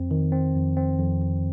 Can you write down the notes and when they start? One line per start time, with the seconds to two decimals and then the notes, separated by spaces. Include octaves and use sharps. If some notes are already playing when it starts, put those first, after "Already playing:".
Already playing: F2 C4
0.11 D#3
0.32 C4
0.55 F2
0.77 C4
0.99 F2
1.22 F2